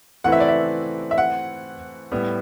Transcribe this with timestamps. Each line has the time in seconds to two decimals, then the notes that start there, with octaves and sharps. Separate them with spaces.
0.24 E3 A3 C4 E4 B4 F#5
0.32 E5
0.40 D5
0.48 E5
1.11 E5
1.18 F#5
2.12 A2 G3 B3